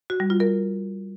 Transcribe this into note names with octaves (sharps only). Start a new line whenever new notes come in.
F#4
G3
F4
A#4